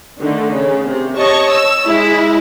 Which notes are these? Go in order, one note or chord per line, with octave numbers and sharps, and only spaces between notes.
D3 D#3 A3
C#3
C3
C#5 D#5 A5 C#6
E6
G#3 E4